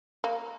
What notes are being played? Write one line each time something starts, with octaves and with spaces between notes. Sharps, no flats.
A#3